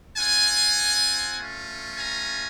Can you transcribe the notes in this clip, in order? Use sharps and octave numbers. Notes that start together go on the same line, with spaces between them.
C4 F4 F#5 G#5
A3 C#4 F4
G#5 A#5